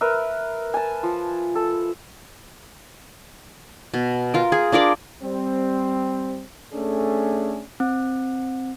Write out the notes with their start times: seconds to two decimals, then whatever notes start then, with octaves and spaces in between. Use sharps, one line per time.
0.01 A#4 B4 E5
0.74 G#5 A5
1.03 F3
1.55 A4
3.94 B2
4.34 F4 A#4
4.52 G#4
4.72 D4 F4 A#4 D5
5.23 G3 C4
6.74 A3 C#4 D4 G#4 A4
7.80 C4